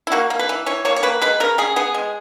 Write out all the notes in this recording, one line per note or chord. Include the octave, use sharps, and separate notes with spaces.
E4
A#3 F#4
A#3
B4
E3
E3 C#5
A#3 C#5
C#5
A#3 B4
G#3 B4
C#3 A#4
C#3 G#4
B3 G#4
G#3